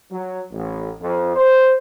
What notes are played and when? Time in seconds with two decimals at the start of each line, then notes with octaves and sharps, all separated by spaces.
0.11 F#3
0.52 A1
1.01 F2
1.36 C5